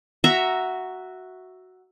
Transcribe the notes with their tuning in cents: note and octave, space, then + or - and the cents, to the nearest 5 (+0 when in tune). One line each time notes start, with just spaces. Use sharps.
F#4 +0 E5 +0 A#5 +0